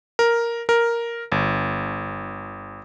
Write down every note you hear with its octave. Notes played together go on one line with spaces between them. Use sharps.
A#4
A#4
G1